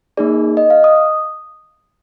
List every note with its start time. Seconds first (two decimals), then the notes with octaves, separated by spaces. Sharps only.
0.17 A#3 D#4 G#4 D5
0.57 D#5
0.70 F5
0.84 D#6